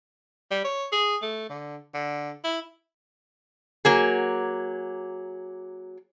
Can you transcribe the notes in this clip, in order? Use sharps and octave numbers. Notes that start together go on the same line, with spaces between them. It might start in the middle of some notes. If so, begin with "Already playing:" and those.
G3
C#5
G#4
A3
D3
D3
E4
F#3 A#3 G#4